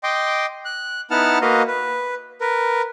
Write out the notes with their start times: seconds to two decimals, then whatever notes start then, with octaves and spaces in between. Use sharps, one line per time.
0.03 D#5 G5 C6 D6
0.65 F#6
1.11 B3 D#4 E4 F#5 A5 F6
1.41 A#3 F#4 B4 D#5 F5
1.67 B4
2.41 A#4 B4